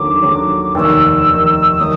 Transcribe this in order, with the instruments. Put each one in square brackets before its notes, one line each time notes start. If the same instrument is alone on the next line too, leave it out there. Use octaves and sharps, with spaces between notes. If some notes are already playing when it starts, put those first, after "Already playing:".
Already playing: [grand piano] D#2 D3 F#3 [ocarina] D6
[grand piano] D#2 D3 F#3
[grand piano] F1 D#2 D#3 [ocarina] E6
[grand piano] F1 D#2 D#3
[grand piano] D#3 F#3 [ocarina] D#6